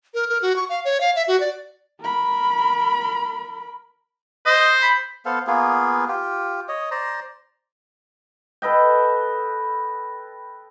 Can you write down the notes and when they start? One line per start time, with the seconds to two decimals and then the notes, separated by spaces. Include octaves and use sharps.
0.14 A#4
0.29 A#4
0.42 F#4
0.56 C#6
0.69 F5
0.85 C#5
1.01 F5
1.16 E5
1.28 F#4
1.40 D5
2.01 A#4 B5
4.46 C5 D#5
4.83 B5
5.25 B3 A4 C5 F5
5.47 A#3 B3 F4 G#4
6.08 F4 G4
6.68 C#5 D#5
6.91 C5 D5 A#5
8.62 A4 B4 D#5 G5